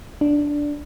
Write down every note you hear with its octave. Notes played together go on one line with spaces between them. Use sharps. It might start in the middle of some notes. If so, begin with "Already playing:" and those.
D4